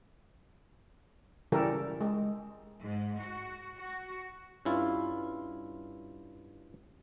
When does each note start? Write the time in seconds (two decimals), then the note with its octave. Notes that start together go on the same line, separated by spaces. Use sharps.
1.52 C#3 E3 G3 G4 A4 A#4
2.01 G#3
2.80 G#2
3.19 F#4
3.78 F#4
4.65 G2 C#4 E4 F4